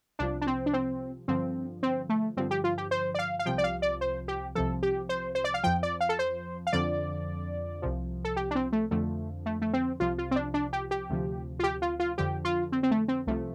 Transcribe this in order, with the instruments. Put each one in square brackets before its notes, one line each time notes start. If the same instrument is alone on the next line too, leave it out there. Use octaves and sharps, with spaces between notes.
[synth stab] C2 C3 F3 D4
D4
C4
D4
C4
G2 D3 F3 C4
C4
A3
G2 D3 F3 C4
G4
F4
G4
C5
D5
F5
F5
C2 C3 F3 G5
D5
F5
D5
C5
G4
C2 C3 F3 A4
G4
C5
C5
D5
F5
F2 F3 G5
D5
F5
A4
C5
F5
F2 D3 F3 D5
C2 C3 F3
A4
G4
D4
C4
A3
F2 D3 F3 A3
A3
A3
C4
C2 C3 F3 F4
F4
C4
D4
D4
G4
G4
D2 C3 F3
F4
G4
F4
F4
F2 D3 F3 G4
F4
C4
C4
A3
C4
C2 C3 F3 A3